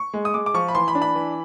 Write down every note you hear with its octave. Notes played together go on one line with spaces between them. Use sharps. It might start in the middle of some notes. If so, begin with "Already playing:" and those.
Already playing: C#6
G#3
D#6
G#3 D6
D6
F3 C#6
B5
E3 C6
B5
D4
B5
E3